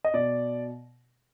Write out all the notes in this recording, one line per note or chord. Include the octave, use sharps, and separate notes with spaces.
D#5
B2 D5